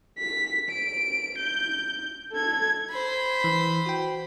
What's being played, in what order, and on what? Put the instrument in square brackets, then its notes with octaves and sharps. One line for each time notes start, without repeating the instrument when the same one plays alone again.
[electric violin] B6
D7
G6
A4 G#6
[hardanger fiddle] C5 B5
[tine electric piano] E3
F#4 G5